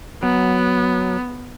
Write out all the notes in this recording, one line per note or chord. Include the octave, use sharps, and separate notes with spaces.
F#3 B3